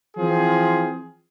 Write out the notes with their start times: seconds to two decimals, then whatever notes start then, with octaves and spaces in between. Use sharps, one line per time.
0.17 E3 F3 C4 G#4